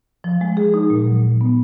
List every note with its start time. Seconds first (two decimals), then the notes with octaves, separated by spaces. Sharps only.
0.24 F3
0.41 G#3
0.57 G#4
0.74 D#4
0.90 A#2
1.07 F#3
1.24 A#2
1.41 B3